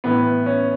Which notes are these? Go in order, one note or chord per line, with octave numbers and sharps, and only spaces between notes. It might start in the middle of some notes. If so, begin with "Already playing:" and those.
A2 E3 B3
C#4